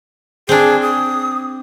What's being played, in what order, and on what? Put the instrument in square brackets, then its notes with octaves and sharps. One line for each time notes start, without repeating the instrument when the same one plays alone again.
[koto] C4 D4 [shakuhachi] G#4
[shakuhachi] D#6